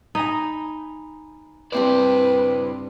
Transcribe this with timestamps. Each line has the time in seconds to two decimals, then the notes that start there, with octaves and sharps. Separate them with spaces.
0.15 D#4 G#5 A#5 B5
1.72 G2 C4 E4 B4 C5 D5 D6